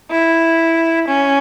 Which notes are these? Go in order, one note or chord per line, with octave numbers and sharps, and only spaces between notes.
E4
C#4